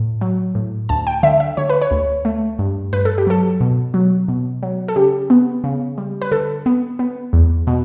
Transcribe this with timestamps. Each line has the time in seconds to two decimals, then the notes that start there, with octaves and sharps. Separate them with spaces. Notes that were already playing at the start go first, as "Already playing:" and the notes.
Already playing: A2
0.21 F#3
0.55 A2
0.89 D2 A5
1.07 G5
1.23 D3 E5
1.40 E5
1.57 D3 C#5
1.70 B4
1.82 C#5
1.91 D2
2.25 A3
2.59 G2
2.93 G2 B4
3.05 A4
3.18 G4
3.27 F#3 A4
3.61 B2
3.94 F#3
4.28 B2
4.62 F#3
4.88 A4
4.96 C#3 G4
5.30 B3
5.64 C#3
5.98 G3
6.22 B4
6.32 D3 A4
6.66 B3
6.99 B3
7.33 E2
7.67 B2